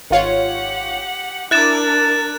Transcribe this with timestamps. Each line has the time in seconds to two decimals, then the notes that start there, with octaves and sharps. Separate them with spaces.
0.10 G#1 F4 G4 C#5 F#5
1.51 D4 E4 A#4 D6 F#6 A6 E7